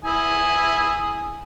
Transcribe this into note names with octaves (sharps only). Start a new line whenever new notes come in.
E4 G#5 D#6